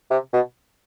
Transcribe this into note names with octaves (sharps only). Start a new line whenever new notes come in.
C3
B2